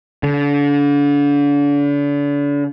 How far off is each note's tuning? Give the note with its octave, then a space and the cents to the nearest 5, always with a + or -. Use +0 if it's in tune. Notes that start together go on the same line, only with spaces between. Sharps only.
D3 -35